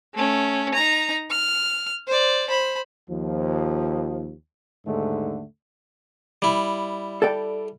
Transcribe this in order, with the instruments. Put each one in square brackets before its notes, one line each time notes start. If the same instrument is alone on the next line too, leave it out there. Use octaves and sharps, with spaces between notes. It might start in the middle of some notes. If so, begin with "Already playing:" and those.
[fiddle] A3 C#4
D#4 A#5
F6
C5 D5
C5 B5
[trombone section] D#2 F3
D#2 G#2 D3 A3
[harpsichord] G3 E4
[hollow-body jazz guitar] A4 D5 G5